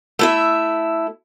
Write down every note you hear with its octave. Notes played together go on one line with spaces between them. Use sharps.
A3 E4 E5